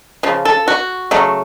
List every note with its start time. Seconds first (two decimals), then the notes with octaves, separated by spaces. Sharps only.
0.23 C#3 F3
0.45 A4
0.68 F#4
1.11 C#3 F#3 A3